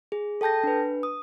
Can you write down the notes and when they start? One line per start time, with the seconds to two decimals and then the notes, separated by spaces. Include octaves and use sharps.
0.12 G#4
0.41 A4 G5 A5 G6 A#6
0.64 D4 B4
1.03 D#6